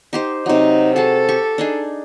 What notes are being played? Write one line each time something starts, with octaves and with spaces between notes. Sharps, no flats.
D#4 G4 C5
C3 F#3 D#4
F#4 G#4 A4 A5
G4 C#6
D4 D#4 G#4